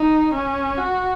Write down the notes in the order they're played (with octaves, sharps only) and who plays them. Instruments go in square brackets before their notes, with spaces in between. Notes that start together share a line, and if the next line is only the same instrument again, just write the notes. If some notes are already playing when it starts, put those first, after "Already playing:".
Already playing: [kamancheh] D#4
C#4
F#4